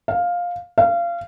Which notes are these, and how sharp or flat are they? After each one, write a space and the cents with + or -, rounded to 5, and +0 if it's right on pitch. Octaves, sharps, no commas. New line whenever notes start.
F5 +10
F5 -25